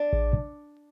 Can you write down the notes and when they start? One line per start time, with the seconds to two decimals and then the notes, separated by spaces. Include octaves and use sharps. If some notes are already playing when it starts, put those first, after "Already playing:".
Already playing: D4
0.13 A1